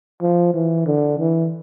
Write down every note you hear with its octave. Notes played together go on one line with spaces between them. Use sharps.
F3
E3
D3
E3